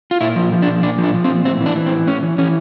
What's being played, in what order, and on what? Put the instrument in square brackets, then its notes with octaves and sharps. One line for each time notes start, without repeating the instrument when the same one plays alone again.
[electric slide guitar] F4
A#2 E4
F3
F3
D4
A#2
A#2 D4
F3
D4
F3
C4
A#2
A2 C4
E3
D4
E3
C4
A2
A2 C#4
E3
E3 C#4